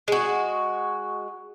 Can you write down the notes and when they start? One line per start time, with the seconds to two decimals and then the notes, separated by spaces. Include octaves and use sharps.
0.08 G#3 F#4